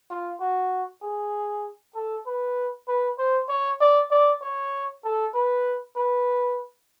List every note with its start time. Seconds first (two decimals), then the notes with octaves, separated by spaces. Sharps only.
0.10 F4
0.40 F#4
1.02 G#4
1.95 A4
2.26 B4
2.88 B4
3.18 C5
3.49 C#5
3.81 D5
4.11 D5
4.42 C#5
5.04 A4
5.34 B4
5.96 B4